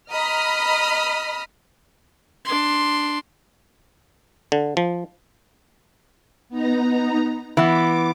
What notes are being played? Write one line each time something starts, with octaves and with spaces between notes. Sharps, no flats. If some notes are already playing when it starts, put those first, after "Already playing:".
D#5 A#5 B5 D#6 F6
D4 C6
D3
F3
B3 D#4 A#5
E3 B3 D6